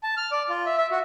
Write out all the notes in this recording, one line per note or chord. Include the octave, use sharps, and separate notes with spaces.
A5
F6
D5
F4
E5
E5
F#4